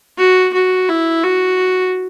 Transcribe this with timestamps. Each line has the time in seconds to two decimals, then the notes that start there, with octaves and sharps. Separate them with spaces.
0.18 F#4
0.54 F#4
0.88 E4
1.23 F#4